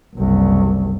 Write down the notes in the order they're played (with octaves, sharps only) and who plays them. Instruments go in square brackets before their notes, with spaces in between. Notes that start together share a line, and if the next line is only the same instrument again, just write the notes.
[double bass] F#1 C2